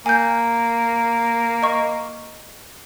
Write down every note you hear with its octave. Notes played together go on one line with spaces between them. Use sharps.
A#3 G#5 G6
D#5 C#6